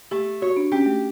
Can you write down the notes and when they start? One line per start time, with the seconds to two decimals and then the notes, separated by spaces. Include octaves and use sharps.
0.11 A3 G4
0.42 F#4 C#5
0.57 D4
0.72 C#4 G4
0.86 A3